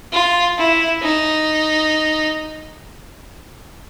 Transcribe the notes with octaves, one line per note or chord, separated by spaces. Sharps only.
F4
E4
D#4